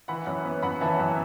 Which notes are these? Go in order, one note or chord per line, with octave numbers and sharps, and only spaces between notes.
E3 F#5 B5
F#2
B3
F#2 F#5 B5
E3 E5 A5
F#2